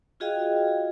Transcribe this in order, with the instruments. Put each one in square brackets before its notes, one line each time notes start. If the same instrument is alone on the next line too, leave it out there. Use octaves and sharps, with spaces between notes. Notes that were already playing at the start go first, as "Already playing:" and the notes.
[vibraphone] F4 F#4 G#4 D#5 F5 G5